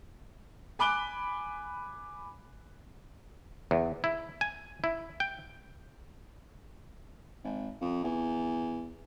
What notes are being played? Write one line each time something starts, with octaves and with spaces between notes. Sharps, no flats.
G#5 B5 D6 F#6 D7 G7
E2
E4
G#5
E4
G5
G#1
F2
E2